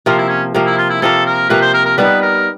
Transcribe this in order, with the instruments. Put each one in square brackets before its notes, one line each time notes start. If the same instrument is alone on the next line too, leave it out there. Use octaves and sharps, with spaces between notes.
[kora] C3 F3 A#3 [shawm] F4
[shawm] E4
C#4
[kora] C3 F3 A#3
[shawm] E4
F4
E4
[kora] C3 F3 A#3 [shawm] A4
[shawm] A#4
[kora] C3 F3 A#3 [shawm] B4
[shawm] C5
A#4
A#4
[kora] G3 B3 D#4 [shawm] B4
[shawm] A#4